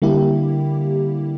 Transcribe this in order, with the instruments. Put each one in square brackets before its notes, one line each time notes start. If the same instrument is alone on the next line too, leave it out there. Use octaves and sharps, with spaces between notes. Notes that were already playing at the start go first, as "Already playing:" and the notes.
[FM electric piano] D3 G3 A#3 E4 G4